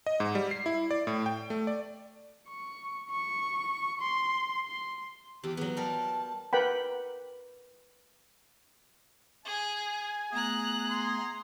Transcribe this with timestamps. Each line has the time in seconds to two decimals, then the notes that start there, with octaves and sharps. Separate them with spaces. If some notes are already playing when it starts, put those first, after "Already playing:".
0.06 D#5
0.20 G#2
0.35 G3
0.51 C7
0.66 E4
0.91 D5
1.07 A2
1.26 G5
1.50 A3
1.67 D5
2.49 C#6
3.11 C#6
4.01 C6
4.67 C6
5.43 E2 G4
5.57 F#3 B3 G#4
5.77 G3 A#4 A5
6.53 A#4 B4 F#5 G5 B5
9.45 G#4 G#5
10.32 A3 B3 G#4 A#5 F#6
10.90 A#5 C6